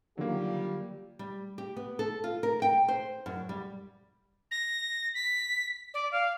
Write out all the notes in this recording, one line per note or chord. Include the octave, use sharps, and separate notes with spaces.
D3 D#3 F#3 G3 A#3 F4 G4
G3
G4
B3
A4
F4
A#4
G5
C5
F#2
G3
A#6
B6
D5
F5